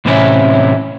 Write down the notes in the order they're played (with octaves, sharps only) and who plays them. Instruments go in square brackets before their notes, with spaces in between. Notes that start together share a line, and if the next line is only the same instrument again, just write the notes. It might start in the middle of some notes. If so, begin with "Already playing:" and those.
[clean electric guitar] A2 C3 E3 C4 C#4 E4